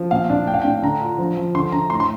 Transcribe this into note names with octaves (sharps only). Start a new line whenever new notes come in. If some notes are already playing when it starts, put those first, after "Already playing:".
Already playing: F3
A#2 F5
D4
A2 G5
F5
G5
D4
D3 A#5
F4
F3
F3
D3 C6
D3 A#5
A2 C6
C6